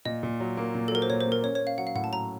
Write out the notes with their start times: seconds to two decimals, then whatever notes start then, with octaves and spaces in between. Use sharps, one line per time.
0.05 A#2 D#5
0.23 A#2
0.40 F#3
0.57 A#3
0.75 A#2
0.88 A4
0.92 F#3 A#4
1.02 C5
1.09 A#2 C#5
1.20 C5
1.27 A#3
1.32 A#4
1.43 C#4 C#5
1.55 C#5
1.60 C#4
1.67 F5
1.78 F#3 F#5
1.87 F5
1.95 A2 F#5
2.04 A5
2.13 F#3 A#5